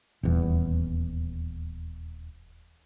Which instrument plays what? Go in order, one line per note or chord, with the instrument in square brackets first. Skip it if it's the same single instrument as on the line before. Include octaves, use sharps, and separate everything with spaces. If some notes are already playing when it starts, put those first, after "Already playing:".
[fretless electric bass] D#1 E2